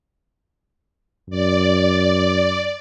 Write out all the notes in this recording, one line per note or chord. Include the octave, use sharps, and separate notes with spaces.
F#2 D5